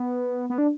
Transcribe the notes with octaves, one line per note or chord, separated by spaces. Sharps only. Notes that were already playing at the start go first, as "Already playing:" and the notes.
Already playing: B3
B3
D4